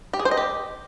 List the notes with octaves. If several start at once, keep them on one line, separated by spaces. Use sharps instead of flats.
G4
G#4
C5
D#5
G4